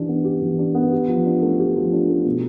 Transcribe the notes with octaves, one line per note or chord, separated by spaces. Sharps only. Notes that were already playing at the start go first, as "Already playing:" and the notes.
Already playing: E3 D4 G4
B3
G4
E3
D4
B3
G4
F3
D4
A3
G4
F3
D4
A3
B2